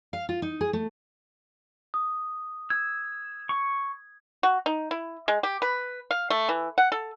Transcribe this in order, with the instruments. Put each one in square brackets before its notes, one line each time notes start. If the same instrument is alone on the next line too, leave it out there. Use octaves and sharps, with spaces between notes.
[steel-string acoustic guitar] F5
F4
D#4
G#4
A3
[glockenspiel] D#6
[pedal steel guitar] E6 [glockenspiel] G#6
[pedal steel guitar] C#6
[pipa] F#4
D#4
E4
G#3
G4
B4
F5
A3
E3
F#5
A4